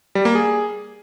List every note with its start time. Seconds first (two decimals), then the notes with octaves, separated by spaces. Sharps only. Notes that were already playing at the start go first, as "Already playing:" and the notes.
0.15 G3
0.25 A#3
0.35 G#4